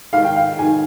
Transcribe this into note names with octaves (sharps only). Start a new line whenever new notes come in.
G#2 D#3 F5
G5
F5
G#2 D#3 G#5